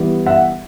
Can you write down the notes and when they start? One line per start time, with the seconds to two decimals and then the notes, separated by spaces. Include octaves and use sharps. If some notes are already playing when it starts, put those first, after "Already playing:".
Already playing: E3 G3 B3
0.26 E5 F#5